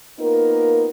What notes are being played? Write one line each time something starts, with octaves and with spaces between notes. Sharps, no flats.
A#3 B3 D#4 F4 A#4